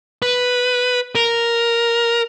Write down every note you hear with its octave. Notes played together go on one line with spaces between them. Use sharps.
B4
A#4